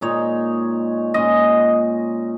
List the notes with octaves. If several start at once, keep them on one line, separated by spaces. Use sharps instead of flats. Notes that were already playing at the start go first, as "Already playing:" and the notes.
A#2 G#3 D#4 C#5
A#2 G#3 C#4 D#5